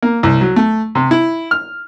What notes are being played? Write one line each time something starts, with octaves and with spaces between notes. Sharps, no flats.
A#3
C2
F#3
A3
C3
E4
F6